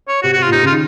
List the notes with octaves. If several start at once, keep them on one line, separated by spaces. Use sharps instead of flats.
C#5
C3 F#4
F#4
C3
F4
A#2
C3 D#4
C#3 F4
D#3